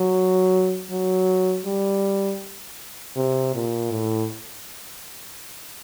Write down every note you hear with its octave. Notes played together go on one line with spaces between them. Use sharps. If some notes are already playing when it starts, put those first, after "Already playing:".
Already playing: F#3
F#3
G3
C3
A#2
A2